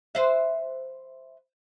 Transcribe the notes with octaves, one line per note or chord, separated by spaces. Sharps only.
B4 C5 E5